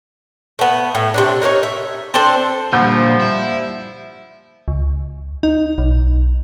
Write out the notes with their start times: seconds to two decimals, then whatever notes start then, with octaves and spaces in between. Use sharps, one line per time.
0.59 A3 B3
0.95 A2
1.14 C3 C#4 D4
1.42 D#4 A#4 C5 C#5
1.63 E5
2.14 C4 D4 A4 C5
2.73 A#2 D3 F3 G3 F#5 B5 G6
3.20 E4
4.68 C#2
5.43 D#4
5.78 B1